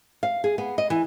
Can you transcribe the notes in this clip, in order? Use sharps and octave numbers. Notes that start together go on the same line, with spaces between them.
F5
G#4
B3
D#5
E3